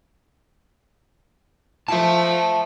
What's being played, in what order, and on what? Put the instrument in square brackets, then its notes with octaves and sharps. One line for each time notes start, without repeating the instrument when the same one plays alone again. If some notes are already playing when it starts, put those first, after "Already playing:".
[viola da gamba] F3 [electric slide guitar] E5 A5